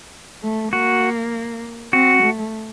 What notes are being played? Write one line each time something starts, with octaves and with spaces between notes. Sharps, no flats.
A3
A#3 F#4
C4 F#4
A3